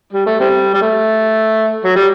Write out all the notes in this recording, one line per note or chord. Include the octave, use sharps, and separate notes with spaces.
G3
A3
C3 G3
G3
A3
F#3
G3